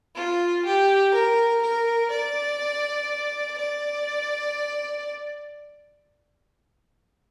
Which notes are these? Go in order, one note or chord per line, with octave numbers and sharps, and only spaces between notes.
F4
G4
A#4
A#4
D5
D5